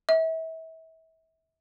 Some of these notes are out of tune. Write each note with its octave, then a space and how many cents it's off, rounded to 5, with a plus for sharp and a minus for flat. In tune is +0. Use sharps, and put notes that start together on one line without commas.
E5 -35